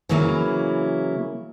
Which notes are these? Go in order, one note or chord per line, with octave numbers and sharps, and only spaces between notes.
C#3 E3 F#3 A#3 E4